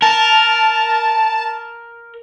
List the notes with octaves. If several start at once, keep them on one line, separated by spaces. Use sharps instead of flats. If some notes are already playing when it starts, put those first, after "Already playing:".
A#4 A5